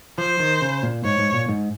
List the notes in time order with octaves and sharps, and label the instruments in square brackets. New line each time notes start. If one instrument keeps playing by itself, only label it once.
[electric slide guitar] F3 [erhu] C5
[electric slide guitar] D#3
C#3
A#2
[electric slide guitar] G#2 [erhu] C#5
[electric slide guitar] G#2
A#2
G#2